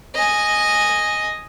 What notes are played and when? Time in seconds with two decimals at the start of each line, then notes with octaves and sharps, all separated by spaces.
0.15 D#5 G#5